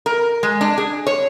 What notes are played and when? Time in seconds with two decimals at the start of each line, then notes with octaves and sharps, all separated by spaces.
0.06 A#4
0.43 G#3
0.61 D4
0.78 G#4
1.07 C#5